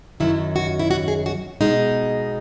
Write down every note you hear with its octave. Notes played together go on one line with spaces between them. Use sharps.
F#2 D#3 F#3 E4
F#4
E4
F#4
G#4
F#4
B2 G#3 D#4